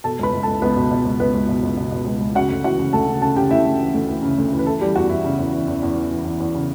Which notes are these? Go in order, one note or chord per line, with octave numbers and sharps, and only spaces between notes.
B2 A4 A5
C#2 B4 B5
C#2
A4 A5
C#2
C#2 B3 B4
B2
B2
C#2
C#2 B3 B4
C#2
B2
C#2
B2
B2
C#2
C#2
C#3 F#4 F#5
D2
E3 F#4 F#5
C#3
D2 A4 A5
C#3
C#3 A4 A5
C#3 G4 G5
D2 E4 E5
D2
E3
D2
E3
C#3
D2
E3
B4
E3 A3 A4
E3 G3 G4
E2 F#4
E2 E4
C#3
E2
E3
E2
E2
E3
E3
E2
E2
C#3